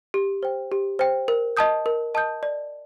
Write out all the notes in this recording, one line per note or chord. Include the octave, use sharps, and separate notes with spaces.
G4
C5 G5
G4
C5 G5
A#4
D#5 A5 D#6 G6
A#4
D#5 A5 D#6 G6
D5